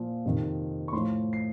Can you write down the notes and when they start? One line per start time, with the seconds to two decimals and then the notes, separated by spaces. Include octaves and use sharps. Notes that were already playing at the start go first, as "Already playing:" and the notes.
Already playing: A#2 F3
0.25 F2 C3 D#3
0.88 C#6
0.93 A2 C6
0.97 F3
1.33 C7